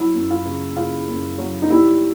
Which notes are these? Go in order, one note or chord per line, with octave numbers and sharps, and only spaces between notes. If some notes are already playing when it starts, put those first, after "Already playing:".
Already playing: F#3 E4
F#2
F4
C#3
C#3 F4
F#2
F#3
D#4
G3 E4